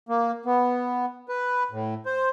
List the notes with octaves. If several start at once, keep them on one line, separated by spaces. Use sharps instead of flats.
A#3
B3
B4
A2
C5